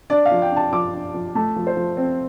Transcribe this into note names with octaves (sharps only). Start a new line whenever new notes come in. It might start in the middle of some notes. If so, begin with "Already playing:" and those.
D4 D5
F5
F3
G5
D4 A5
F3 D6
D4
F3
A3 A5
F3
C5
F3
C4